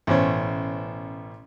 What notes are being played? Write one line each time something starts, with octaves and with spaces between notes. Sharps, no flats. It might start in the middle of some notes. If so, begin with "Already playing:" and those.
A1 B2 C#4 C5 C#5